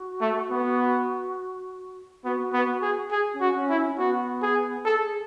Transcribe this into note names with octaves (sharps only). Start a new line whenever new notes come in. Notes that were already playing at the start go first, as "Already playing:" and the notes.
Already playing: F#4
A3
B3
B3 F#4
B3
G#4
G#4
C#4
F#4
C#4
E4
C#4
B3 F#4
G#4
G#4 A4